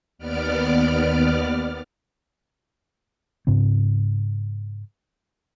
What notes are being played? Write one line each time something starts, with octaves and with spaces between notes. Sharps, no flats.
D#2 B3 D5 D6 F6
G#2 C#3 C4